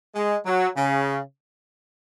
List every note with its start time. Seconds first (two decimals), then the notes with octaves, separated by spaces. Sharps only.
0.15 G#3
0.46 F#3
0.76 C#3